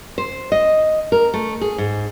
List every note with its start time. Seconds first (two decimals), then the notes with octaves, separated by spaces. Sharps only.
0.18 C5
0.52 D#5
1.12 A#4
1.34 A3
1.61 G#4
1.78 G#2